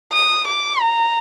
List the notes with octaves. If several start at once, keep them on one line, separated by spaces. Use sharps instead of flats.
D#6
D6
A#5